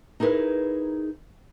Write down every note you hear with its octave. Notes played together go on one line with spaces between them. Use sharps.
D#4 E4 G#4 A#4 B4